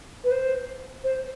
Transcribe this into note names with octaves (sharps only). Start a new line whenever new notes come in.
B4
C5
C5